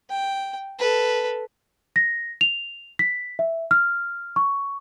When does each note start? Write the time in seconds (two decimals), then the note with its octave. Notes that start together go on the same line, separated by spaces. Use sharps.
0.10 G5
0.79 A4 B4
1.96 A#6
2.41 F7
2.99 B6
3.39 E5
3.71 F6
4.36 C#6